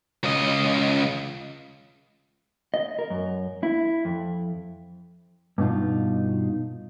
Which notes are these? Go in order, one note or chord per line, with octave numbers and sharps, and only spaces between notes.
C#2 D#5
D#5
A#4
F#2
E4
F2
G2 B2 D#4 F4